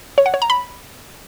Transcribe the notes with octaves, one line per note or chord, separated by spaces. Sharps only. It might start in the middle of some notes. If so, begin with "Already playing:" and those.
C#5
F#5
C#5
A#5
B5